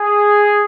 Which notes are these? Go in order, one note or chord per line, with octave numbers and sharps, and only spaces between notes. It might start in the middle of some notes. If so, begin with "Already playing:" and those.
Already playing: G#4